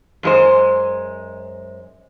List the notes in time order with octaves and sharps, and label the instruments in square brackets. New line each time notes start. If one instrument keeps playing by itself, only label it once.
[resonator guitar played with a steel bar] F#2 G#3 C5